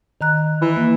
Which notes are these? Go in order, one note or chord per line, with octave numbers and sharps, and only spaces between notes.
D#3 A#5 F#6
E3
A#3